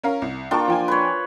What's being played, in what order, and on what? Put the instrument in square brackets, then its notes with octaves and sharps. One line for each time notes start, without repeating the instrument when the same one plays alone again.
[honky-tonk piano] C#4 A#4 F5
C2
[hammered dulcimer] A#3 D4 F4 [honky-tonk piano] G5 A5 C#6
[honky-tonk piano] F3 G5 G#5
[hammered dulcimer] B4 C#5